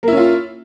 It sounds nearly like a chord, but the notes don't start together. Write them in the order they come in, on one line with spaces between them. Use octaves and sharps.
A#3 E4 C#4 F4